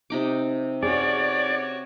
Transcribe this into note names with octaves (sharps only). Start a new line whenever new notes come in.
C3 D#4 D6
C#4 F#4 G#4 C#5 D5